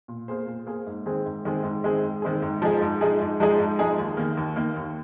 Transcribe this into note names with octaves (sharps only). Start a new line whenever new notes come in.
A#2
A#3 G#4 C5
A#2
A#3 G#4 C5
G#2
D#3 G#3 C4 G#4
G#2
D#3 G#3 C4 G#4
G#2
D#3 G#3 C4 G#4
G#2
D#3 G#3 C4 G#4
G#2
F3 G#3 D#4 G#4
G#2
F3 G#3 D#4 G#4
G#2
F3 G#3 D#4 G#4
G#2
F3 G#3 D#4 G#4
D#2
D#3 A#3
D#2
D#3 A#3
D#2